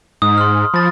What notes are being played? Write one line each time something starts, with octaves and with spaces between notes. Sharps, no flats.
G#2 D#6
C6 F6
F3 B5 A6